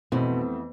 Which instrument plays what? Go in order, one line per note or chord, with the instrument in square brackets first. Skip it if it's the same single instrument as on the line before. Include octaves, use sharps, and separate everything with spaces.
[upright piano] F2 E3 A3 C4 [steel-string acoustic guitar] B2